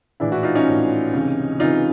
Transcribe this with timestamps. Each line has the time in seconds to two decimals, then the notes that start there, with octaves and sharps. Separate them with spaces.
0.20 A#1 A2 E3 D4 E4
0.32 E4 F#4
0.43 D#4 F4
0.55 C#4 D#4
0.67 A#1 A2 E3
1.13 C#2 C3 E3
1.59 C#2 C3 E3 D#4 F4